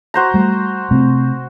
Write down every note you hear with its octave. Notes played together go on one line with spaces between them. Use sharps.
F#4 C5 A#5
G3 A3
C3 A3 C4